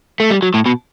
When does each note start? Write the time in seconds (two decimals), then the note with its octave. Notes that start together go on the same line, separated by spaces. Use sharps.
0.20 A3
0.31 G3
0.42 F#3
0.54 A2
0.66 B2